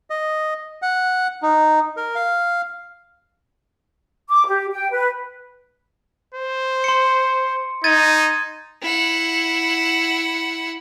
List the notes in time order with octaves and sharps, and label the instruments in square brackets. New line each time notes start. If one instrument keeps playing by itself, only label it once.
[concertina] D#5
F#5
D#4
A#4
F5
[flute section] D6
G4
G5
B4
[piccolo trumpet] C5
[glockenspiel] C6 C#7
[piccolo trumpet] D#4 [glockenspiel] G#6 A6 D#7
[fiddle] E4 F#5